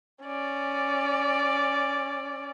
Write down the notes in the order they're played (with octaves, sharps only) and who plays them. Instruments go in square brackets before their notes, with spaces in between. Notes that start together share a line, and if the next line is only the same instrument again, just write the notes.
[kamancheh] C#4 D5